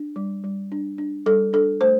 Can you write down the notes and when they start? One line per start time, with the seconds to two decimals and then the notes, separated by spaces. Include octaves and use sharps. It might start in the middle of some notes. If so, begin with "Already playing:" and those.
Already playing: D4
0.16 G3
0.44 G3
0.72 D4
0.98 D4
1.26 G3 A4
1.53 D4 A4
1.81 A3 C5